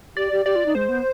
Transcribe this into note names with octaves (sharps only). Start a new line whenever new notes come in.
G4 D5
G4
G4 D5
F4
D#4
G#3 C5
B3